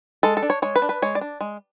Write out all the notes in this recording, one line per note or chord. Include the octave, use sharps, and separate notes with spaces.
G#3 A4
A4
D4
C#5
G#3 C#5
B4
D4
B4
G#3 C#5
D5
D4
G#3